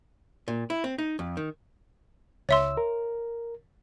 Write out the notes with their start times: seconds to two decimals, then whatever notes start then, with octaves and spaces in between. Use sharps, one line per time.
0.48 A#2
0.70 E4
0.84 C4
0.98 D#4
1.19 F2
1.37 D#3
2.49 C#2 C#5 E5 C6 E6
2.77 A#4